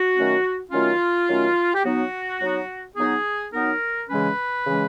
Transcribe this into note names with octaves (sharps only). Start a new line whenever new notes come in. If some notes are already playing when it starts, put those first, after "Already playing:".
Already playing: F#4
D#3 F#3 A3 C#4
D#3 F#3 A3 C#4 F4
D#3 F#3 A3 C#4
G4
F#3 B3 D#4 F#4
F#3 B3 D#4
F#3 B3 D#4 G#4
F#3 B3 D#4 A#4
C#3 E3 G#3 C#4 B4
C#3 E3 G#3 C#4